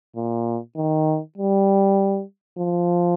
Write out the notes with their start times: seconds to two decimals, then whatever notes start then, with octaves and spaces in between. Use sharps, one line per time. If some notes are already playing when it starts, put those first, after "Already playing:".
0.16 A#2
0.77 D#3
1.38 G3
2.58 F3